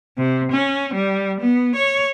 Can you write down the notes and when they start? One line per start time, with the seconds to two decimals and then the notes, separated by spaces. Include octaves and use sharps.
0.18 C3
0.52 C#4
0.94 G3
1.41 B3
1.76 C#5